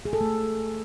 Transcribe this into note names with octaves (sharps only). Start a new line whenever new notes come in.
G#4
A4
A3